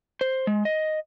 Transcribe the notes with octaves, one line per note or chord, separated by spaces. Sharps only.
C5
G#3
D#5